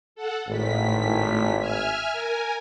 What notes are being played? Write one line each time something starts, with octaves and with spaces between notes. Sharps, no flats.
A4 F#5
G#1 A2 B6
E5 G#5 F6
A#4 G#5